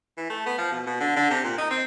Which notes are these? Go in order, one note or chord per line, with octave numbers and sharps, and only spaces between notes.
E3
A3
B3
F3
B2
B2
D3
D3
C3
A#2
D#4
C4